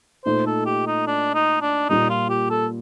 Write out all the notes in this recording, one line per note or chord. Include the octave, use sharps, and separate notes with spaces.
A#2 A3 D#4 C5
A4
G4
D#4
D4
D#4
D4
A#2 G3 A#3 D#4
F4
G4
A4